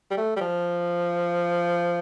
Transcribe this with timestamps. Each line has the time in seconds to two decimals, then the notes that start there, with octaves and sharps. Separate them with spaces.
0.11 G3
0.17 A3
0.36 G3
0.41 F3